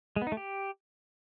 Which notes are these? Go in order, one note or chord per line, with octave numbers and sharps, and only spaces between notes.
G#3
B3
D#4
A3
G4